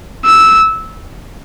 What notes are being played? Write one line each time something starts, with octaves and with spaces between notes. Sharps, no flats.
E6